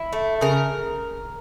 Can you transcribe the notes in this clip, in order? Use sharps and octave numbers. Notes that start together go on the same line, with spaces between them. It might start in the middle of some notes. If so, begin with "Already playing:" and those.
Already playing: E4
A3
C#3 A#4